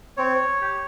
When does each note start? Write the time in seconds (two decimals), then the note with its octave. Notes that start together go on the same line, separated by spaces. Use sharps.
0.17 C4 C#5
0.61 G4